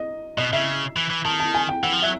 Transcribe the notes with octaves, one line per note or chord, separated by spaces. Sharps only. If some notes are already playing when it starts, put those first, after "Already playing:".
Already playing: D#5
B2 D#5
C#3 E5
E3
E3
D#3 A5
A5
G#5
G5
E3 F#5
F3
F#3 E5